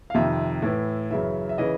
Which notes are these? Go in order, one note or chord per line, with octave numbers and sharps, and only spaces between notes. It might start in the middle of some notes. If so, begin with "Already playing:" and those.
F5
F2 C3 D#3 E5
A2 E3
F#2 C#3 E3 E5
E5
C#3 E3 D#5